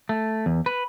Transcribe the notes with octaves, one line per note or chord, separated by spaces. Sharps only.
A3
E2
B4